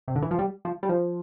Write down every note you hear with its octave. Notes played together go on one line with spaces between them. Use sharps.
C3
D3
E3
F3
G3
F3
G3
F3